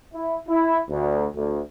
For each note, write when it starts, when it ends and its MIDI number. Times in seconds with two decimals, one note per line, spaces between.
0.13 0.37 64
0.48 0.80 64
0.90 1.27 38
1.36 1.61 38